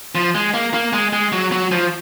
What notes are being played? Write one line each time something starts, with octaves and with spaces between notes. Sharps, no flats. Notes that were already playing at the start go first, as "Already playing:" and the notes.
F3
G#3
A#3
A#3
G#3
G#3
F#3
F#3
F3